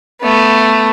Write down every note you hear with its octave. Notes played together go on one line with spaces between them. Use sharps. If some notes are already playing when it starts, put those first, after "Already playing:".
A3 B3